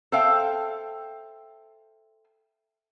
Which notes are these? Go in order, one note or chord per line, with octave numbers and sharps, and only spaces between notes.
A4 C5 E5 F5 G5